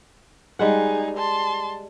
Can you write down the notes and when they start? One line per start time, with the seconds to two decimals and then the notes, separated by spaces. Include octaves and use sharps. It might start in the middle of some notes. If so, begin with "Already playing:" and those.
0.59 G3 G#3 D#4 G#4 F#5
1.17 A5 C6